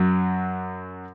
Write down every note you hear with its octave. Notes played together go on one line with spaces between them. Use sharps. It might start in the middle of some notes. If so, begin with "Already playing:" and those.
Already playing: F#2 F#3